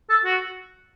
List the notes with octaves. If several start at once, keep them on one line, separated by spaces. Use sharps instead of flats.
A4
F#4